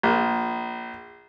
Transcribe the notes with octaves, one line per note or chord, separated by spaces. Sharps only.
A#1